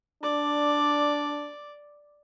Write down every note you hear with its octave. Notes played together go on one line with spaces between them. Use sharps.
D4 D5